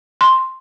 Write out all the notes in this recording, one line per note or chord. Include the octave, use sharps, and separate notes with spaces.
C6